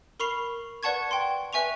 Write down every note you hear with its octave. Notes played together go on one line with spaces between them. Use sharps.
A#4 B5 C#6 C7 F7
B4 D5 F#5 A5 C#6 G#6
G5 C6
B4 E5 G#5 C#6 F7